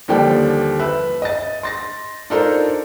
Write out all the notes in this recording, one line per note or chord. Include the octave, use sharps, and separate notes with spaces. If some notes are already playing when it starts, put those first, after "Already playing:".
D#2 D3 F3 G3 D5 G5
B4 E5
D#5 A6
C6 A6 A#6
D4 D#4 F4 A4 A#4 C5